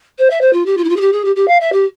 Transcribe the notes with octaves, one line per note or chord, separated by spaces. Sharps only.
C5
E5
C5
F4
G4
F4
E4
F4
G#4
G4
G#4
G4
G4
F5
E5
G4